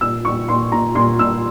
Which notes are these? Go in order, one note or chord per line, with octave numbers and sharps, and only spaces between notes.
A#2 E6
A#2 C#6
A#2 C6
A#2 A#5
A#2 C6
A#2 E6